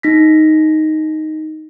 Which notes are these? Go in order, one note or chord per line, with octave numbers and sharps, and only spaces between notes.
D#4 A#6 B6